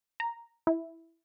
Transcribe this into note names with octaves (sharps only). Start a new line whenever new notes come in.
A#5
E4